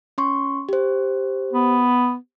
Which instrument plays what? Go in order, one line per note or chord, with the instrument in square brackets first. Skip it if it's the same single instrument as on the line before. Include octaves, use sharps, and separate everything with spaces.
[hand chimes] C#4 C6 C#6
G4 C5
[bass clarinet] B3